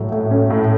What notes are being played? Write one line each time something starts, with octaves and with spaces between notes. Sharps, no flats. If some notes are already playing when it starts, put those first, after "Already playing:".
Already playing: A2 F#3
A2
C#4
A2